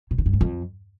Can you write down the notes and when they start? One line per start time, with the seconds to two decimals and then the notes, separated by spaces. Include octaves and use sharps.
0.11 B2
0.18 D3
0.26 G2
0.33 G#2
0.41 F2